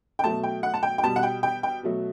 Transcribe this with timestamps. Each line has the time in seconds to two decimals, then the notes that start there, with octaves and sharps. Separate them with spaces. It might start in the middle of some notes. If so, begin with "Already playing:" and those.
0.19 G5
0.24 B2 F#3 A3 A5
0.43 G5
0.63 F#5
0.74 A5
0.83 G5
0.98 G5
1.04 B2 G3 A5
1.16 F#5
1.23 G5
1.43 G5
1.63 G5
1.83 B2 F#3 A3